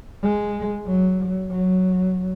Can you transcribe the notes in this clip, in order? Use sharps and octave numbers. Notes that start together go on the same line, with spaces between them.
G#3
F#3
F#3